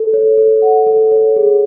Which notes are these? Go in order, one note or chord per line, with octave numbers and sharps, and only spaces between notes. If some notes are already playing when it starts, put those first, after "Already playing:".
Already playing: A4
C#5
A4
F#5
A4
C#5
G#4